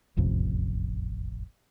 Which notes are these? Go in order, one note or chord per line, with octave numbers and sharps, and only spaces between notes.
E1 A1 F2 C3